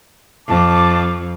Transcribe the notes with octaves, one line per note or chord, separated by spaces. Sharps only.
F2 A5 D6